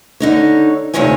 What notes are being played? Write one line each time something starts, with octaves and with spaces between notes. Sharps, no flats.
D3 D#4 C#5
D2 C3 D#3 F3 C#5 G#5